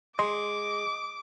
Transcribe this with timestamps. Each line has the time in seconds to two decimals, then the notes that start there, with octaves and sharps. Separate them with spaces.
0.19 G#3 D#5 C6 D6